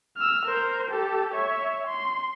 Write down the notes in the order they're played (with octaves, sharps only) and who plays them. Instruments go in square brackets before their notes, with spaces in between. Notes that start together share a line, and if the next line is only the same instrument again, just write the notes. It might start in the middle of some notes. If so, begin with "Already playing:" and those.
[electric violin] E6 F6
A#4 C5
G4 A4
C#5 E5
C6